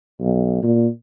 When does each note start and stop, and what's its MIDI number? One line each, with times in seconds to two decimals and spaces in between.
0.20 0.59 35
0.63 0.87 46